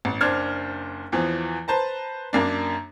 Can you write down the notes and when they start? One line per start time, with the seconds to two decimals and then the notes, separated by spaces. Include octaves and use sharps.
0.05 A1
0.21 F#1 D4 C5 F6 G#6
1.12 E2 E3 F3
1.68 B4 C5 A5 A#5
2.33 F#2 A#3 D4